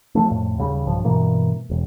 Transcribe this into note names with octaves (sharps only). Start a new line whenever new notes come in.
F3 A3
F2 A2
D#2 C#3 G3
B1 G2 F3
G2 B2 E3 A#3
E1